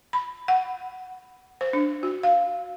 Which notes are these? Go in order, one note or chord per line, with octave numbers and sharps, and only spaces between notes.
B5
F#5
C5
D4
F#4
F5